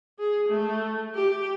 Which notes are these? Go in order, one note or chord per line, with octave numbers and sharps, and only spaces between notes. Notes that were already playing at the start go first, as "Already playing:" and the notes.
G#4
A3
G4